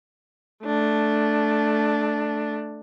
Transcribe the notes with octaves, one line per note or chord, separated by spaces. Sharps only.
A3 D4